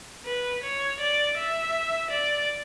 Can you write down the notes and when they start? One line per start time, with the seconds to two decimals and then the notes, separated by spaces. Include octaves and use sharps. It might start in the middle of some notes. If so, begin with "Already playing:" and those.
0.26 B4
0.63 C#5
1.00 D5
1.38 E5
2.10 D5